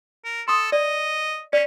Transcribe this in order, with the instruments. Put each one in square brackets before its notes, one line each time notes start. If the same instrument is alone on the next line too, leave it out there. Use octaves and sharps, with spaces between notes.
[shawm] A#4
[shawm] A4 [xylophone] C6 D#6
[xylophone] D5 [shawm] D#5
[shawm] C#4 [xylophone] D5 B6